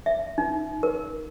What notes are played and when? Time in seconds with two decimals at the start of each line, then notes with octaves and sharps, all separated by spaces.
0.06 E5
0.38 D#4
0.83 A#4